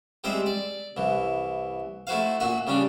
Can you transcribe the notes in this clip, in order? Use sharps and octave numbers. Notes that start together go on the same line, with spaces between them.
G3 G#3 C4 C5 D#5 E5
D5
C2 E3
A3 E4 F#4 C5 F5
A#2 F#4 E5 C#6
C#3 G3 C#4 D4